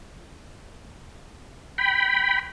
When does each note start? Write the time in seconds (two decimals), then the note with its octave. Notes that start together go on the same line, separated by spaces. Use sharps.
1.78 G5 B5